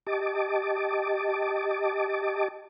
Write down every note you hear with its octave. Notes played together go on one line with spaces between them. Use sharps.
G4 D#5 A5 D6